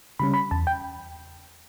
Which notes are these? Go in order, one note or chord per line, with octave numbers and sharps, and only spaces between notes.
C#3 G3 C#4 B5
B5
E2 A5
G5